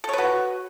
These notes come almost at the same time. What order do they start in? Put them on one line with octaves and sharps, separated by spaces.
A4 C#5 B4 F#4